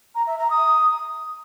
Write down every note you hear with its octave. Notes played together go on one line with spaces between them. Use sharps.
A#5
E5
A#5
D#6